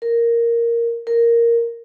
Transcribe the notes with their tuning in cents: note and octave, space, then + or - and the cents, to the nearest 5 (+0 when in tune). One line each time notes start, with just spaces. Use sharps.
A#4 +0
A#4 +0